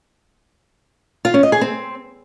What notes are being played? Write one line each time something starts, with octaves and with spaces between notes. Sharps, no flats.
F4
C#4
D#5
G#4
C4